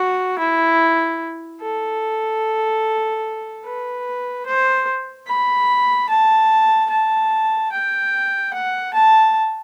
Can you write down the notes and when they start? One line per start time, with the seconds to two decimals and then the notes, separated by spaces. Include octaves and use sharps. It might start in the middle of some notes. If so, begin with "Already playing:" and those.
Already playing: F#4
0.39 E4
1.61 A4
3.65 B4
4.46 C5
5.27 B5
6.09 A5
6.90 A5
7.72 G5
8.54 F#5
8.94 A5